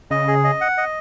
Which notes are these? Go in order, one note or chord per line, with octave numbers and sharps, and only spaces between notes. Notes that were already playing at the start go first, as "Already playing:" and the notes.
C#3 D#5
G#4
D#5
F#5
D#5